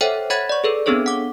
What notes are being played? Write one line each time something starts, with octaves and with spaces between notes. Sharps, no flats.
A4 C5 C#5 E5 F#5 G5
C5 C#5 F#5 B5 G#6 A6
D5 C#6
G#4 A4 B4
B3 C4 D4 G#4 A4 C#5
F#5 D6